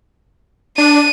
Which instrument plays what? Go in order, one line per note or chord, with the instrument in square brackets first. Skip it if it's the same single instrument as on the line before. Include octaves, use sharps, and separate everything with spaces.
[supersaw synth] D4 [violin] D#7